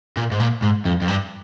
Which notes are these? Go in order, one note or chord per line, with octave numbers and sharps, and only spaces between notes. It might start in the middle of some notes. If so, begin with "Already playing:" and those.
A#2
G#2
A#2
G#2
F2
F2
G2